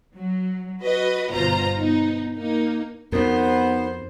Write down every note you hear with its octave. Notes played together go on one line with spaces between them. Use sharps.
F#3
F#4 B4 D#5
G1 B2 F4 C5 A#5
B3 D#4
A#3 D#4
F2 B3 D#4 F#4 A#4 C5